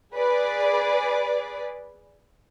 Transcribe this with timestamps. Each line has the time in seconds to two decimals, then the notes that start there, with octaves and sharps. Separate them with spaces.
0.16 G#4 B4 D5